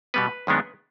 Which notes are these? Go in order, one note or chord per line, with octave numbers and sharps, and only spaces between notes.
B2 G3 B3 B4
F#2 D#3 G#3 B3 D4